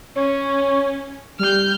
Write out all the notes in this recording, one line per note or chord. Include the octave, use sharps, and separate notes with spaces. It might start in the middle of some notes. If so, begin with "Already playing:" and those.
C#4 C#5
G3 F6 G6